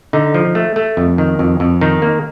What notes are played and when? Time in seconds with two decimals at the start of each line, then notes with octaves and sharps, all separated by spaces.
0.13 D3 D#4
0.34 F3
0.55 A3
0.76 A3
0.97 F2
1.18 D#3
1.39 F2
1.60 F2
1.81 D#3 D#4
2.02 A#3